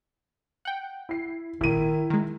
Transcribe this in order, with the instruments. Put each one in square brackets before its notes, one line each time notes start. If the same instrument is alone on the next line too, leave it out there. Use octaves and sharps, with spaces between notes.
[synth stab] F#5 G5
[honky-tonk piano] E4 C7
[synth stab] G#1 A#2 [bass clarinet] D#3 [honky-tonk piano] E4 D#7
[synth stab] D#3 G#3